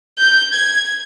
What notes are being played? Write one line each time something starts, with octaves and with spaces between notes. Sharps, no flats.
G6
G#6